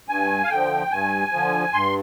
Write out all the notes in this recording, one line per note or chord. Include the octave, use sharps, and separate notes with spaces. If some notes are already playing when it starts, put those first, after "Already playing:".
G2 G#5
F5
D3 F3 G5
G2 G#5
D3 F3
G2 C6